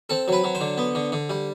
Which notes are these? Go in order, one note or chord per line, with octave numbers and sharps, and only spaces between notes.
C4 A4
F#3 B4
F#3
C5
D3
B3
D3
D3
G3